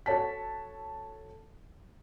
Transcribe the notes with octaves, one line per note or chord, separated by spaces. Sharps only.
F#4 A4 C#5 A5 B6